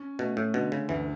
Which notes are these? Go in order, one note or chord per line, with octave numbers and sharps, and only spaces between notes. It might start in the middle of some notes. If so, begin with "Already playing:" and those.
Already playing: C#4
B2 A3
A2
B2 D3
C#3
D2 E3